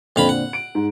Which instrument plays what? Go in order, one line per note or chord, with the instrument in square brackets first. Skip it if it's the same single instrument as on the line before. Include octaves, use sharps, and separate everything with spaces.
[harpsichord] F2 F5 B5 [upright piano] A#2 D3 C4
[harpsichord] F#5
[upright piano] D7
G#2